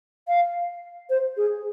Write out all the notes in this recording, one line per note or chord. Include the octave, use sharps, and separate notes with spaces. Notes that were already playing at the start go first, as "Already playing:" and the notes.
F5
C5
G#4